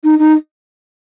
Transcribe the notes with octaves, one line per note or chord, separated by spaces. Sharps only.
D#4
D#4